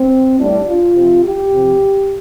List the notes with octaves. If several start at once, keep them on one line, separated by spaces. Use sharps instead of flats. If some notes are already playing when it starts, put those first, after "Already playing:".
Already playing: C4
A2 G3 D4
F4
C3 F3
G4
C3 F3